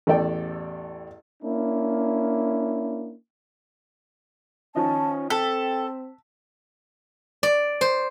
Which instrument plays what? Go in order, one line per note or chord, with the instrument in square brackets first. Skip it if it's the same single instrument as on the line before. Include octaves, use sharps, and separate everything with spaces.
[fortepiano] A1 E2 A4 D5 G5
[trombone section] A#3 C#4 D4 E4
[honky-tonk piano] D#3 F3 D#5 [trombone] C#4 [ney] A5
[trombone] C4 [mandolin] A4 [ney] G5 [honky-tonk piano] B6
[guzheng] D5
C5